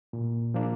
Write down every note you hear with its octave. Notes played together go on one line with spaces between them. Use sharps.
A#2
F3 A#3 D4